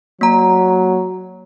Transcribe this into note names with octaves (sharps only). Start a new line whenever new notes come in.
F#3 A#3 A#5